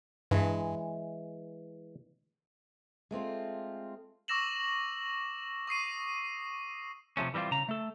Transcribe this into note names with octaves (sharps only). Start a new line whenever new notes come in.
G2 E3 G#3
G#3 A3 C4 F4
C#6 D6 E6 A#6 E7 F#7
C#6 D#6 C7 D#7
C3 F3 A3 C#4
E3 G3 C4 D#4 F4
C#3 A#5
A3 A4